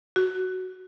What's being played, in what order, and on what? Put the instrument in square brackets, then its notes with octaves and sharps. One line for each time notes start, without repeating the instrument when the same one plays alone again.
[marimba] F#4